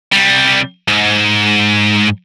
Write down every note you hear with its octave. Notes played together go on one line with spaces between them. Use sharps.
C2 G3
G#2